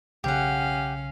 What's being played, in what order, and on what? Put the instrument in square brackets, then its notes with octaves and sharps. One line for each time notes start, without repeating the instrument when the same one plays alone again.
[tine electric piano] B1 C#3 [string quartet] C#4 F5 [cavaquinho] G4 F#5